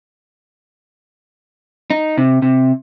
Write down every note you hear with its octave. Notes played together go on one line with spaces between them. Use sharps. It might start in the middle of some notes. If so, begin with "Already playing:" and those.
D#4
C3
C3